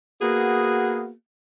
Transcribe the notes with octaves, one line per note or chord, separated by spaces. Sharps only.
A#3 B3 F#4 G#4